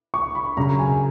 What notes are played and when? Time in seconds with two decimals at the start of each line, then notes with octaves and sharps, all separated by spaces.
0.14 C#6
0.35 B5
0.57 F#2 C#3 F#3 A#5
0.79 G#5